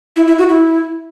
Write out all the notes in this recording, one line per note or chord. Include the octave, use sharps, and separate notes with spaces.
E4
E4
F#4
E4